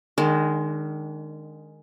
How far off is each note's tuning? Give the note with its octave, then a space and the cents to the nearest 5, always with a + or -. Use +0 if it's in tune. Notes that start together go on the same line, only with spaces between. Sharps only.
D#3 -20 G#3 +0 D4 -40